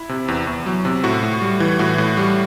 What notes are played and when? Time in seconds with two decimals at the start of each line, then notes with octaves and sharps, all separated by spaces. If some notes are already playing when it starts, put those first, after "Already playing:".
Already playing: E4
0.09 C3
0.28 E2
0.47 E2
0.66 F#3
0.85 C3
1.04 A2 F#4
1.23 A2
1.41 G3
1.60 E3
1.79 A2 F#4
1.98 A2
2.17 G3